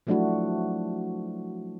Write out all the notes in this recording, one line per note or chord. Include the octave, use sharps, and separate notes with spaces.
F3 F#3 A3 D4 E4 F#4